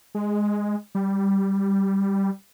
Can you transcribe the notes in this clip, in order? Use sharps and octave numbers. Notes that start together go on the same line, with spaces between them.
G#3
G3